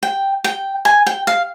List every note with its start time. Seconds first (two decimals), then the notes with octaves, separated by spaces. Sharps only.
0.03 G5
0.44 G5
0.85 G#5
1.07 G5
1.27 F5